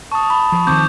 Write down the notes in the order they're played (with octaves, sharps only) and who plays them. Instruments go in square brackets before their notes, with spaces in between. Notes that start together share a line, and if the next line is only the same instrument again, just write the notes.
[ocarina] A5 [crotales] C#6 D#6
[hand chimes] B5
[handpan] F3
[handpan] D#3 C4 [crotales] C#6 D6 G6